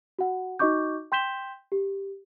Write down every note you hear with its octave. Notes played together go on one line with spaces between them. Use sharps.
F#4 F#5
D#4 F#4 D#5 C#6 D6 G6
G5 C6 G6 B6 E7 G7
G4